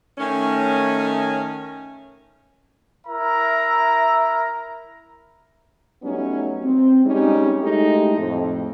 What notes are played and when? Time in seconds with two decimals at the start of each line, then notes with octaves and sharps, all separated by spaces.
0.18 D#3 A3 C#4
3.07 E4 A#4 E5 A#5
6.03 F#3 G3 A3 B3 C#4 D#4
6.63 C4
7.05 G3 G#3 C4 C#4 D#4
7.61 G#3 A3 D#4 E4 G4 A4
8.16 F2 A2